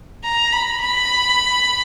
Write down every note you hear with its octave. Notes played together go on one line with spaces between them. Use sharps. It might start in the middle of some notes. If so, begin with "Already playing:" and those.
A#5
B5
B5